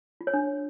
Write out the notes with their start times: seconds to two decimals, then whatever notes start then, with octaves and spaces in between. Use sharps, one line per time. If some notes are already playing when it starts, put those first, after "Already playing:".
0.21 F4
0.27 C#5
0.34 D4